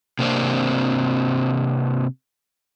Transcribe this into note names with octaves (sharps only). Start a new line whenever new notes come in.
C3 A#3 C4 D4